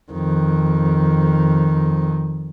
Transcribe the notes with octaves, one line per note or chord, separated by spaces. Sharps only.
F2 D#3